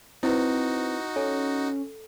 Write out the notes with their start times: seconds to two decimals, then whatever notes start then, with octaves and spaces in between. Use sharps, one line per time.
0.23 C4 D#4 E4 F#4 B4
1.16 C#4 A4